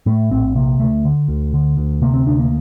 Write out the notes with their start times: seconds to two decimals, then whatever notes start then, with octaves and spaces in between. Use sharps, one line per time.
0.06 A2 A3
0.31 A#1 C4
0.55 C3 A#3
0.80 D2 A3
1.05 D3
1.28 D2
1.54 D3
1.77 D2
2.02 C3 A#3
2.14 C4
2.26 D2 D4
2.39 A#3